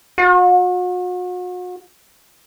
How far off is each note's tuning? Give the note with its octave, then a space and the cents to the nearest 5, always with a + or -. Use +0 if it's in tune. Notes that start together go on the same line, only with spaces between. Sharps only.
F#4 -40